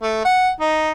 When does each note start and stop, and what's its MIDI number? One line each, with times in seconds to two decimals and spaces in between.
0.02 0.22 57
0.25 0.50 78
0.60 0.91 63